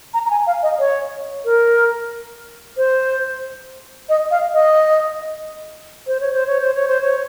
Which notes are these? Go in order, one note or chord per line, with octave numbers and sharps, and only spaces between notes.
A#5
A#5
G#5
F5
D#5
C#5
A#4
C5
D#5
F5
D#5
C5
C#5
C5
C#5
C5
C#5
C5
C#5